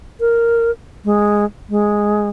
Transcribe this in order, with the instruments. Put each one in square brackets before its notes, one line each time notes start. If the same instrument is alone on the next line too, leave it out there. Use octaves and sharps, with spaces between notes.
[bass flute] A#4
G#3
G#3